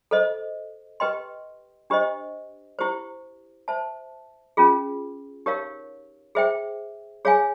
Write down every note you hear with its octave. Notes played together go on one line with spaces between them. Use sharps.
A4 C5 D#5
G4 B4 D#5 G5 C6
D4 G4 C5 D#5
E4 G4 C5
C5 E5 A5
C#4 F4 G#4
D#4 G4 A#4 C#5 F5
G#4 C5 E5 G5
G#4 C#5 F5 G#5